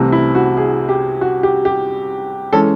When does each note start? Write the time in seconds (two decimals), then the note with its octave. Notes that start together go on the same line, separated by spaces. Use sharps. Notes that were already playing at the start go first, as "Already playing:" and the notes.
Already playing: C2 C3 E3 A3 C4
0.12 E4
0.35 F#4
0.57 G#4
0.89 G4
1.21 F#4
1.43 G4
1.65 G4
2.53 E3 G#3 C#4 A4